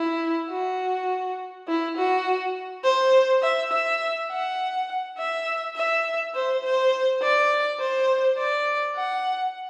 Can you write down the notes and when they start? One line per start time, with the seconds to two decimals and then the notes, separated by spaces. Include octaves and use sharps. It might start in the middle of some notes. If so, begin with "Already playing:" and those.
Already playing: E4
0.51 F#4
1.68 E4
1.97 F#4
2.84 C5
3.43 E5
3.72 E5
4.31 F#5
5.18 E5
5.76 E5
6.35 C5
6.64 C5
7.22 D5
7.80 C5
8.38 D5
8.96 F#5